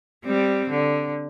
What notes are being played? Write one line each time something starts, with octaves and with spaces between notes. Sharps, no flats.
G3 C4
D3